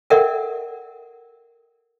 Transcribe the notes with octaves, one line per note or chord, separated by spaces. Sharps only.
A4 A#4 D5 E5 F#5 G5